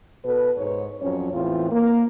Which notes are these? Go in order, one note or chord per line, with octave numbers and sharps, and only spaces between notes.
B2 A4 B4
G#2 C#5
F2 F#3 C#4 C#5
E2 A2 E3 C4 F4
A#3